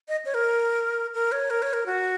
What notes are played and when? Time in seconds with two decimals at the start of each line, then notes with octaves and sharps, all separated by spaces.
0.08 D#5
0.25 C#5
0.34 A#4
1.14 A#4
1.32 C#5
1.50 A#4
1.62 C#5
1.73 A#4
1.86 F#4